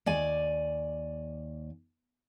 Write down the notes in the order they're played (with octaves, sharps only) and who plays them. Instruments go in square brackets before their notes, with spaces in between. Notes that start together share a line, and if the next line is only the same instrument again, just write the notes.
[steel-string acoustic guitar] D#2 D5 G#5